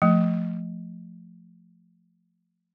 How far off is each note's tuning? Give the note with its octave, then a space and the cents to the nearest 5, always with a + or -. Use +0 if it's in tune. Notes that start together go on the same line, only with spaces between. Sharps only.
F3 +0 A3 +0